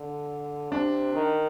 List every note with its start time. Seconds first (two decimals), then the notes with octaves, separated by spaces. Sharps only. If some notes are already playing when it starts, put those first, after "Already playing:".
Already playing: D3
0.71 C3 D4
1.14 D#3